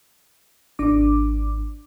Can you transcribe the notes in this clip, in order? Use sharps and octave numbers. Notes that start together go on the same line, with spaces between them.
G#1 D4 D6